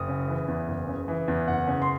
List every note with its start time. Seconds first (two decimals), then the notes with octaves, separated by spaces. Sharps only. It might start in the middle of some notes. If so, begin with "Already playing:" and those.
Already playing: F#1 D#6
0.08 C#3
0.28 E3
0.48 E2
0.68 F#1
0.88 C#3
1.08 E3
1.28 E2
1.48 F#1 F#5
1.67 C#3
1.82 C6